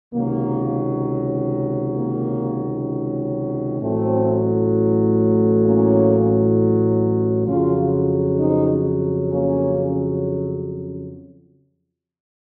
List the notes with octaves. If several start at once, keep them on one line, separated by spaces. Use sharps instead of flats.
C#2 C3 D#3 F#3 A#3
A#3
A1 A2 F#3 A3 C4
A#3 C#4
F2 C#3 F#3 C#4 F4
C4 D#4
A#3 C#4